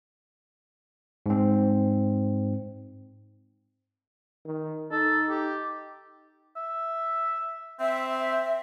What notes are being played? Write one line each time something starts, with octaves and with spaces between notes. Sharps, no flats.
G#2 C4
D#3
D#4 A4
G4
E5
C4 E5